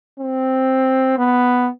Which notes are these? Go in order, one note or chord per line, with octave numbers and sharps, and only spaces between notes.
C4
B3